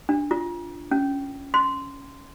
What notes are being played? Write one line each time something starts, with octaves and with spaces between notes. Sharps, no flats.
D4
F4
C#4
C6